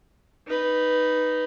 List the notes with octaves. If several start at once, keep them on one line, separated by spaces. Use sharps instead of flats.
D#4 B4